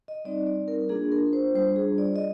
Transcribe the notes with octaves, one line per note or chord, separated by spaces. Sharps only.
D#5
G3 C4 D#4 D5
D5
A#4
A#3 D4 F4 G#4
A#4
C5
G3 D4 F4 C5
G#4
D5
D#5